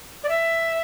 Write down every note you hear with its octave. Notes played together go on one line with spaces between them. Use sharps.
D5
E5